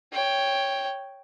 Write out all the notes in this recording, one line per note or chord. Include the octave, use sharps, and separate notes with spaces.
C#5 G5